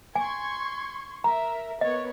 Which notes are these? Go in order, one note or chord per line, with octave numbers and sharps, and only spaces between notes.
G#5 C6 C#6 G#6
A#4 E5 A#5
B3 A#4 C#5 D#5